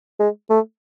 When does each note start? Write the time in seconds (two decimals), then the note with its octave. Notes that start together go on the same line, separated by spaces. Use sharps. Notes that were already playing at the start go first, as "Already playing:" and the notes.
0.20 G#3
0.50 A3